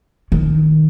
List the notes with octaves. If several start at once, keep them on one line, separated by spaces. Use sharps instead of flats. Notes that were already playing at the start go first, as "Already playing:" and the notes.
D#3